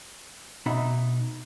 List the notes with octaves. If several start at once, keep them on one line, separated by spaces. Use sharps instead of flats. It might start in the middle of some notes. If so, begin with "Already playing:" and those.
B2 D#4 E5 F#5 A#5 B5